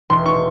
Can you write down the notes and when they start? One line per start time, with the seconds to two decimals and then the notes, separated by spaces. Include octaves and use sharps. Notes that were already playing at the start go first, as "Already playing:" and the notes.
0.10 E1 C6
0.26 C#6